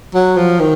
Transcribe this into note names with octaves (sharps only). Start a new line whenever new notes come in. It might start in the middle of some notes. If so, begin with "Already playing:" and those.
F#3
F3
D#3